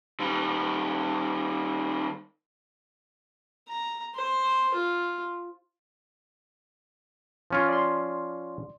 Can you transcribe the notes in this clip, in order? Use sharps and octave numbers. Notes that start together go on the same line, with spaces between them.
D#3 G3
A#5
C5
F4
F3 C#4 F4
D5 C6